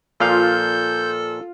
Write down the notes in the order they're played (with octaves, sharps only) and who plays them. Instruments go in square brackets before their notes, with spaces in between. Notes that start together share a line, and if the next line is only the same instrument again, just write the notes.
[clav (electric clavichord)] A#2 F3 F5 [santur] F4 [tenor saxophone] A4 [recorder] G6